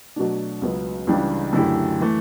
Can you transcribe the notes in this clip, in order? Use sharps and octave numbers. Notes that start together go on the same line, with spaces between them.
B2 F#3 A3 D4
C#2 C#3 F#3 B3
C#2 C#3 E3 G3 D4
F#2 D3 A3 E4 G4
E3 A3